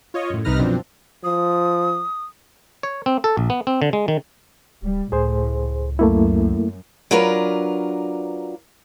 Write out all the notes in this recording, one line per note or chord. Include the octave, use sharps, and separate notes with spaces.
F4 C#5 D#5
F#2 A2
C2 C3 D#4 B4 F6 A#6
F#2 B2 F3 C4 D4
F3 D#6
C#5
C4
A4
A#1
B3
C4
D3
G#3
D#3
D1 G3
C#2 A2 G#4 C5
F#2 A3 A#3 E4
F#3 D4 F4 A#4 B4